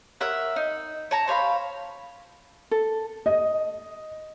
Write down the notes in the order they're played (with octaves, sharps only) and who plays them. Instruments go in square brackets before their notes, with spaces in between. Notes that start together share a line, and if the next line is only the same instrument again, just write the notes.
[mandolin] A#4 C#5 E5 F#5
D#4
C#5 A5 A#5
C5 C#5 F5 B5
[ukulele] A4
[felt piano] D#5